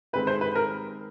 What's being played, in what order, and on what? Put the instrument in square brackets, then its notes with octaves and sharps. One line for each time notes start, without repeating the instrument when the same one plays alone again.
[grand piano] D#3 G#3 C4 [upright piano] B4
[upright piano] C5
B4
A#4